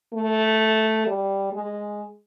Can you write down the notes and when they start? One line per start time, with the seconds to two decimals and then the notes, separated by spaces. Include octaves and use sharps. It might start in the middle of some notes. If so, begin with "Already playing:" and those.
0.14 A3
1.06 G3
1.53 G#3